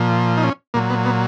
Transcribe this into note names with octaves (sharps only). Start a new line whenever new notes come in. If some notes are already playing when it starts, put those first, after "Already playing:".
Already playing: A#2 F3
D#4
C#4
A#2 F#3 A#3
B3
B3